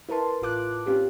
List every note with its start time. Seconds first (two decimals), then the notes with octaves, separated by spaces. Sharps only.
0.09 E4 A#4 B4 A5 C6
0.42 A1 F4 D6 F#6
0.86 C4 C#4 F4 G4